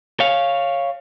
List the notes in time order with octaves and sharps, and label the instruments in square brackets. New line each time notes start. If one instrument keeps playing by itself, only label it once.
[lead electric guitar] C#5 F5